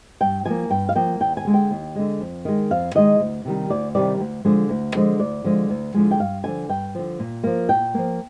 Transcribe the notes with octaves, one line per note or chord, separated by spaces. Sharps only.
G2 G5
F3 A#3 G#5
G2 G5
F5
F3 A#3 G5
D#2 G5
G#5
D3 G#3
G5
D#2
D3 G#3
F2
D#3 G#3
F2 F5
D#3 G#3 D#5
D2
C3 D#3 G3
D2 D5
C3 D#3 G3 D5
D2
D3 F3 G#3
D2
D3 F3 G#3
D2 D5
D3 F3 G#3
D2
D3 F3 G#3
G5
G2 F5
D3 F3 G#5
G2 G5
D3 F3
A#2
F3 A#3
A#2 G5
F3 A#3